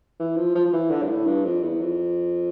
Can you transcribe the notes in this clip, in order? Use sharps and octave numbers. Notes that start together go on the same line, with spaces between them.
E3
F3
F3
F3
E3
D3
G2
A2
G2
F2
E2
F2